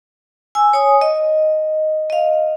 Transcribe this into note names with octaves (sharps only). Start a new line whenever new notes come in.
G#5 E6
C#5 G#5 D#6
D#5
D#5 F5